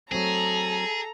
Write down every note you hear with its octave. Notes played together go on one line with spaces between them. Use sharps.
F#3 A3 C4 G#4 A4 A#5